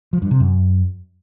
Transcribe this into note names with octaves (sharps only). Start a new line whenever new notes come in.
F3
G2
C3
F#2